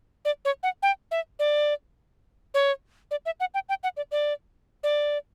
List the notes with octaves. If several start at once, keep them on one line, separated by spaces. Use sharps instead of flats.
D5
C#5
F#5
G5
E5
D5
C#5
D5
E5
F#5
G5
G5
F#5
D5
D5
D5